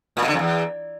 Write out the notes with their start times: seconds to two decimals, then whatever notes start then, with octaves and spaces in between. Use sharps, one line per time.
0.17 A#2
0.22 B2
0.28 D3
0.33 F2
0.39 E2